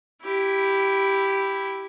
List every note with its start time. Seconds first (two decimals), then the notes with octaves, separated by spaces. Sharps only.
0.23 E4 G4